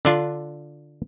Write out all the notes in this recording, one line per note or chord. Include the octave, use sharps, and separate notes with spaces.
D3 D4 F4